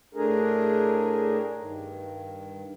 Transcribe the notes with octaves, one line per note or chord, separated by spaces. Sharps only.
A2 A3 D4 G#4 A#4
G2 D#3